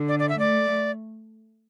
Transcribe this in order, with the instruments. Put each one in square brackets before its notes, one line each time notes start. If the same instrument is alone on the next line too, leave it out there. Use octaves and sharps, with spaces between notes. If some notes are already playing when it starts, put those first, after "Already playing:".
Already playing: [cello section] D3
[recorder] D5
D5
E5
[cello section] A3 [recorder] D5